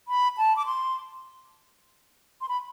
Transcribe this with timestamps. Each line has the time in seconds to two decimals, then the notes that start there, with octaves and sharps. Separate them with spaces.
0.08 B5
0.38 A5
0.56 D6
0.66 C6
2.41 C6
2.49 B5